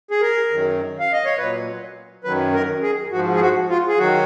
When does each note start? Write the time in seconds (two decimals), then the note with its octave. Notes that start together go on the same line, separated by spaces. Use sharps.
0.11 G#4
0.21 A#4
0.51 F#2 D#3 F#3
0.99 F5
1.12 D#5
1.25 C#5
1.38 A#2 F#3 B4
2.24 F#2 D#3 F#3 B4
2.54 A#4
2.83 G#4
3.11 G#2 F3 F#4
3.35 G#4
3.41 F#4
3.69 F4
3.88 G#4
3.98 D#3 F#3 F#4